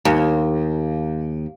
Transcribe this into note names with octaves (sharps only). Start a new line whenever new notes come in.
D#2